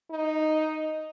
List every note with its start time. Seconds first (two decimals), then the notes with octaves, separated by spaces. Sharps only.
0.10 D#4